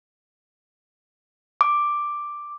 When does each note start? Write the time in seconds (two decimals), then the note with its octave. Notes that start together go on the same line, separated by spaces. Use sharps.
1.61 D6